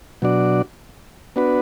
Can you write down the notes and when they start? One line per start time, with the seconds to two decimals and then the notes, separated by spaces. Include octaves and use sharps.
0.22 B2 F#3 D4 F#4 D5
1.36 B3 D4 F#4 B4